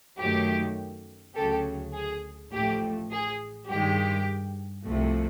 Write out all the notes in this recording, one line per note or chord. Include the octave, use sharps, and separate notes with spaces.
F#2 D#3 F#3 A3 G4
D2 C#3 F#3 G4 A4
G#4
A1 A2 F3 A3 G4
G#4
G2 D#3 G#3 G4
C2 C3 F3 A3